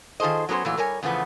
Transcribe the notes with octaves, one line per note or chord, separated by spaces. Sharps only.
D#3 F4 G#4 A4 C5 D#5
F#3 B3 C#4 A#4 C5
A#2 E3 F#3 A3
G3 A#4 C#5 G#5
E2 C#3 F3 A3 B3